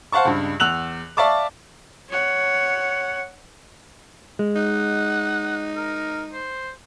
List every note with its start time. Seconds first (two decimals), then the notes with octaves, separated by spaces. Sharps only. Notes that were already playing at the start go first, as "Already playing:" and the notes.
0.12 C5 F5 F#5 A5 C#6
0.25 C#2 G2
0.60 E2 E6 F#6 F7 F#7
1.17 D5 E5 F5 A5 C#6 D6
2.10 C#5 F#5
4.39 G#3
4.56 D#4 F#5
5.76 A#4
6.33 C5